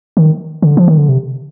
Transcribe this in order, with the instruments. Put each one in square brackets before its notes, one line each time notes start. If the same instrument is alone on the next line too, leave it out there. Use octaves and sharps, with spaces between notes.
[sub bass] D#3
D3
F3
D#3
D3
C3